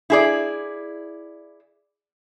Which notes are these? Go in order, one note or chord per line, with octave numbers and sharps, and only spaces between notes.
E4 G#4 D5